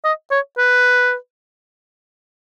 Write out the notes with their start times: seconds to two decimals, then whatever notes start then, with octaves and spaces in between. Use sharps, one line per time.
0.04 D#5
0.31 C#5
0.58 B4